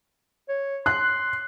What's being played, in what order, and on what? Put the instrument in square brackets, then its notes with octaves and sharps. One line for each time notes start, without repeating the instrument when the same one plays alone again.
[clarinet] C#5
[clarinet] C6 [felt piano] F#6